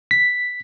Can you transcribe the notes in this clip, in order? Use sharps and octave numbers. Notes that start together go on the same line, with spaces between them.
B6